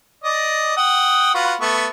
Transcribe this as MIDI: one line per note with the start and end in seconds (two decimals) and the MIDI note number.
0.24 0.75 74
0.24 0.75 75
0.77 1.31 78
0.77 1.31 79
0.77 1.31 87
1.34 1.55 65
1.34 1.55 66
1.34 1.55 71
1.61 1.87 57
1.61 1.87 59
1.61 1.87 85